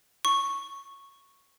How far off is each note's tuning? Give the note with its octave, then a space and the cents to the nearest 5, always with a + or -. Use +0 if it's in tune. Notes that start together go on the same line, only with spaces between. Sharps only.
C#6 -5